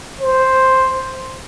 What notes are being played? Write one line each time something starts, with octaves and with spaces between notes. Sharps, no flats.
C5